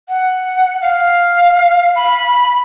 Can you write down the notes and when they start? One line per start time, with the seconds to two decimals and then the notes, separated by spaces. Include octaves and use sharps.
0.09 F#5
0.82 F5
1.96 B5